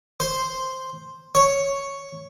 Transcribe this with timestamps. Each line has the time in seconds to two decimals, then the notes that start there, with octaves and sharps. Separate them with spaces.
0.20 C5
1.35 C#5